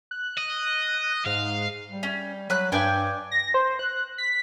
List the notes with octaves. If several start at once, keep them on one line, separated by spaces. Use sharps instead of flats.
F#6
D#5
G#2 F5
G3
C#4
F#3 B4 F#6
G2 D5 G5 G#5
A#6
C5
F#6
B6